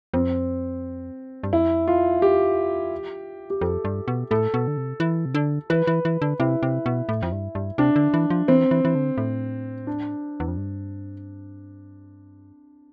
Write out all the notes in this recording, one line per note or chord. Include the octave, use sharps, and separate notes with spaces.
F2 C4
G2
F2 E4
F4
G4
G4
F2 A4
G2
B2
A2 A4
B2
D3
C3
E3
C3
D3
E3 B4
E3
E3
D3
C3 E4
C3
B2
A2
F2
G2
G2
C3 D4
D3
E3
F3
E3 C4
E3
E3
D3
A2
D4
E2
F2
G2